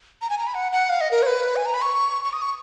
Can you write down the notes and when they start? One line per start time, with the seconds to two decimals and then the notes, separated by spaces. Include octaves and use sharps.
0.22 A#5
0.30 G#5
0.38 A#5
0.47 B5
0.54 F#5
0.72 F#5
0.89 F5
1.01 D#5
1.11 A#4
1.23 C#5
1.26 B4
1.56 G#5
1.66 A#5
1.74 B5
1.82 C#6
2.25 C#6
2.33 D#6
2.42 C#6